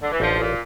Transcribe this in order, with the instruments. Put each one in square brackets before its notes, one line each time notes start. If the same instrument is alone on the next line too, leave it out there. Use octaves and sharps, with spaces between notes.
[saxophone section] D3
E3
[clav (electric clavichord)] A1 [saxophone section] D3 F3
[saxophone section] A#2